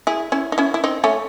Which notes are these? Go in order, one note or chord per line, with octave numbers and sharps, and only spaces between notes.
E4 G#4
C#4 E4
D#4
C#4 E4
E4
C4 D#4
A3 C#4